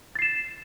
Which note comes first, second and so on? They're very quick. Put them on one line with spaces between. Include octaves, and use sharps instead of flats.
A6 C7 E7